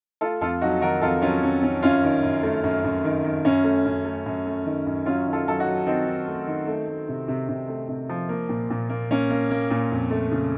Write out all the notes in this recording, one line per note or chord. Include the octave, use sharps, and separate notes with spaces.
A3 F4 A4
F2 F4 A4
F#3 D#4 F#4
D#3 F#4 A#4
F2 F4 A4
F#3 C#4 F4
F2 C#4
D#3 C#4
F#2 C#4 F4
D#3
F#2
A3
F#2
F#2
D#3
D#3
F#2 C#4
A3
F#2
A3
F#2
A3
D#3
F#2
F#3 C#4 F4
D#3
F4 A4
F#3 A4
D#4 F#4
F#3
D#3 C4 D#4
D#3
A3
D#3
A3
A3
C3
C3
C3
A3
C3
F3
A#3
A#2
A#2
A#3
A#3 C#4
A#3
A#3
A#2
F2
A3
C#3